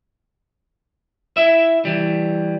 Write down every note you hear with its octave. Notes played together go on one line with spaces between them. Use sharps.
E4 E5
E3 G3